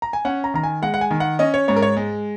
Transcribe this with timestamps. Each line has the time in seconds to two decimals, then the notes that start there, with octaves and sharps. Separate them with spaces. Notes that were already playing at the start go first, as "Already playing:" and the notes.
0.02 A#5
0.13 G#5
0.25 C#4 F#5
0.44 A#5
0.54 D#3 A#5
0.63 G#5
0.82 G#3 F#5
0.94 F#5
1.01 G#5
1.11 D#3
1.20 F#5
1.39 C#4 D#5
1.54 C#5
1.68 G#2 C#5
1.76 A#4
1.82 C#5
1.97 G#3